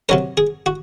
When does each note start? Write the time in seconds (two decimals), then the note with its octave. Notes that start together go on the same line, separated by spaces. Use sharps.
0.09 C3 F#3 C#4 A#4
0.37 G#4
0.66 F#4